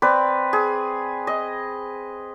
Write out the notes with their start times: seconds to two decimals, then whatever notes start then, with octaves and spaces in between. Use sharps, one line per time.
0.02 C4 B4 D5
0.53 G#4
1.27 D#5